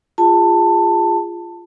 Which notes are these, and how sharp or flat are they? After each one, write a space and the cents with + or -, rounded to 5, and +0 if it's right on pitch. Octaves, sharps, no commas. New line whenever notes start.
F4 -10 G#4 -25 A5 +15